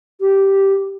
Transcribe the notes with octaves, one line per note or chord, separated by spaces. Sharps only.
G4